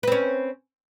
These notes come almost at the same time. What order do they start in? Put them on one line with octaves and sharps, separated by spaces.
B4 C4 C#4